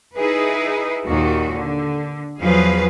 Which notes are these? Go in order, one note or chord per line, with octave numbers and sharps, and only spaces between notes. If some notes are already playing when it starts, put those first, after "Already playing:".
D#4 E4 G#4 B4
D#2 A#2 D#3 F#4
D3
E2 F3 F#3 G#4 B4 F5